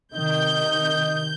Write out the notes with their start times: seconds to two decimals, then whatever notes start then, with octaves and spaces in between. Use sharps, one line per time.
0.14 C3 D#3 D#5 G6